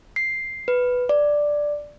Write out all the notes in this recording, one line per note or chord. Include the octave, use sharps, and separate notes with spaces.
C7
B4
D5